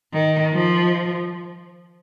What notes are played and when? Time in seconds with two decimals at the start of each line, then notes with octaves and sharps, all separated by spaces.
0.13 D#3
0.54 F3